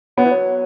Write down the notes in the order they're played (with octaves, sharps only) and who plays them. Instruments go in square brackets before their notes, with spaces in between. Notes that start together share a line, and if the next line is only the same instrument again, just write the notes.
[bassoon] F#3 [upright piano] B3
[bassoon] E3
F#3